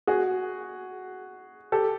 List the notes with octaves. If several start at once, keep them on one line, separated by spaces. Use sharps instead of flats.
F#4 G#4
G4 A4